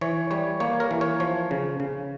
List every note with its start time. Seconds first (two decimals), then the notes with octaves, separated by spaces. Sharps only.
0.01 E3 C#5
0.31 G3 C#5
0.60 A#3 C#5
0.80 A#4
0.91 E3
1.01 C#5
1.20 F3 C#5
1.51 C#3
1.80 C#3